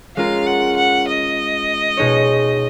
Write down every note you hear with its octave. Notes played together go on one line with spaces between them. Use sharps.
G#3 C#4 F4 A#4 F5
F#5
F#5
D#5
B2 G#3 D#4 G#4 C#5